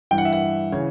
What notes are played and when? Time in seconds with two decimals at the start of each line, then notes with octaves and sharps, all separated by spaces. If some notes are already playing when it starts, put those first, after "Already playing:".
0.11 G2 E3 G5
0.18 F#5
0.25 E5
0.33 F#5
0.72 C#3 E3 C#5